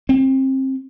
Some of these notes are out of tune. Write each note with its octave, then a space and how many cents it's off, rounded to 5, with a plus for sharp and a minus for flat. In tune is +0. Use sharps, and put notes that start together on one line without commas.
C4 +25